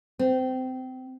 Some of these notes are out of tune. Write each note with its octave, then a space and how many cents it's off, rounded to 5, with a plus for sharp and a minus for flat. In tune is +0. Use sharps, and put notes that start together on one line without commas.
C4 -25